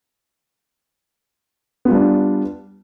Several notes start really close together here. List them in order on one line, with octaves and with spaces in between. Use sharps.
B3 F4 G3 D4